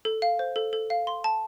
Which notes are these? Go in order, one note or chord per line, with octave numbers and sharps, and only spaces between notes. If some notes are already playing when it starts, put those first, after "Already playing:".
A4
F5
C5
A4
A4
F5
C6
A5